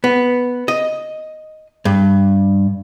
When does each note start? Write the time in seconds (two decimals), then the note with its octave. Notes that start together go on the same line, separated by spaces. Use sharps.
0.04 B3
0.68 D#5
1.85 G2